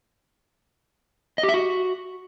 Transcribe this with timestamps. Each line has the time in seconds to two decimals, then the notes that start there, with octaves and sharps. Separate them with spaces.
1.38 D#5
1.43 G4
1.49 E5
1.54 F#4